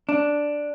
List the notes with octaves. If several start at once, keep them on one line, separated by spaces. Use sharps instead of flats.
D4